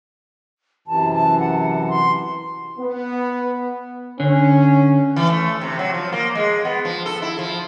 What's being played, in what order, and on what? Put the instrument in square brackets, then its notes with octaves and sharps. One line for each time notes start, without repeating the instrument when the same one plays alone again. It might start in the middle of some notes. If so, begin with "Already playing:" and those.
[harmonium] F#2 C3 E3 [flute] A5
[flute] A5
F#5
C6
[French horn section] B3
[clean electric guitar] D3 [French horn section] C#4
[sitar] E3
A3
C3
F#3
F3
A#3
G#3
B3
F3
A4
E4
F3